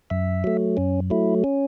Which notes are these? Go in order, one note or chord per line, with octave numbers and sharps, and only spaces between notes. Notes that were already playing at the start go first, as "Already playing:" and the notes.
F#2 E5
F#3 A3
F#2 C#4
F#3 A3 E4
C#4